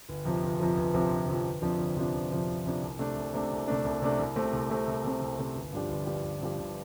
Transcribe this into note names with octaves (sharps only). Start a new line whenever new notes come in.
G1
F2 C3 F3
G1
F2 C3 F3
G1
F2 C3 F3
G1
F2 C3 F3
G1
F2 C3 F3 D4
G1
F2 C3 F3 D4
G1
F2 C3 F3 D4
G1
F2 C3 F3 D4
C2
C3 A3 D4
C2
C3 A3 D4
C2
C3 A3 D4
C2
C3 A3 D4
C2
C3 A3 C4
C2
C3 A3 C4
C2
C3 A3 C4
C2
C3 A3 C4
G1
G2 F3 D4 G4
G1
G2 F3 D4 G4
G1
G2 F3 D4 G4
G1